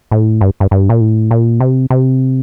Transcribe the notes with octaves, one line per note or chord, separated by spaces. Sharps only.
A2
G2
G2
G2
A#2
A2
A#2
C3
C3